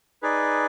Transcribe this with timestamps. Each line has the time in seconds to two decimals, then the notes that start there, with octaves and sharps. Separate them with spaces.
0.22 D#4 G#4 B4 D5